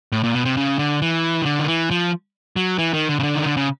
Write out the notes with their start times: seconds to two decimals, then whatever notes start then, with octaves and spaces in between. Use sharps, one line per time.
0.12 A2
0.24 A#2
0.35 B2
0.45 C3
0.57 C#3
0.79 D3
1.02 E3
1.42 D#3
1.46 D3
1.59 D#3
1.68 E3
1.91 F3
2.56 F#3
2.78 E3
2.94 D#3
3.09 D3
3.20 C#3
3.23 D3
3.35 D#3
3.46 D3
3.57 C#3